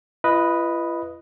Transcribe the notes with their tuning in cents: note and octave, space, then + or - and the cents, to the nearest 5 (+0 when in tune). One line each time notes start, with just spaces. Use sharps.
F4 -45 B4 +0 D#5 +0